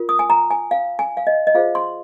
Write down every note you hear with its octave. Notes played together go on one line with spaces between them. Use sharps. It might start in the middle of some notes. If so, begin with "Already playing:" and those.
Already playing: F4 A#4
D#6
G#5
A#5
G#5
F5
G#5
F5
D#5
D#5
F4 G#4 C5 F5
C6